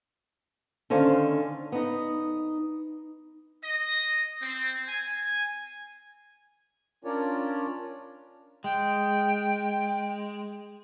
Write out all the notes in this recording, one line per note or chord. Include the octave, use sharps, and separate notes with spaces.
D3 D#3 C#4 C5 F5
B3 D#4
D#5
C4
G#5
C#4 D4 F4 A#4 C#5 D5
G#3 G5